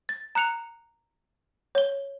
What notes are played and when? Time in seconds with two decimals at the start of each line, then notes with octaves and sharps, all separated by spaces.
0.09 A6
0.35 A#5 F#6 C#7 F7
1.75 C#5 G7